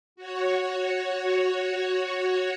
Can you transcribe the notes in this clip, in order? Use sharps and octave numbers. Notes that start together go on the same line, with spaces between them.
F#4 C#5